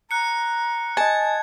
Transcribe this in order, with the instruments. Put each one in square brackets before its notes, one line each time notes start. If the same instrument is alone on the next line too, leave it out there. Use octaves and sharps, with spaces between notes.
[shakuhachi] A#5 [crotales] F#6 C#7
[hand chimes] D#5 G#5 [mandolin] A5 [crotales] G#6